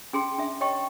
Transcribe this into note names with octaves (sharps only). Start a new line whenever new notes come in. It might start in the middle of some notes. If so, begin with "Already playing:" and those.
C#4 G#4 G5 C6
D4 E5
C#5 D#5 G5 C#6